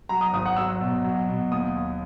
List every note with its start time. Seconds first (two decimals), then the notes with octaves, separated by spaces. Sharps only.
0.09 F#3 A#5
0.21 D#6
0.33 G#1 D#6
0.46 F#5
0.57 F#3 E6
0.81 B2
1.04 F#3
1.29 B2
1.51 D#2 D#6
1.76 D#2